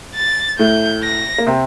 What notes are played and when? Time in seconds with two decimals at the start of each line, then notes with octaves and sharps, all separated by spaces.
0.15 A6
0.59 A2 A3 G6
1.03 A#6
1.38 A#3
1.47 C3 C4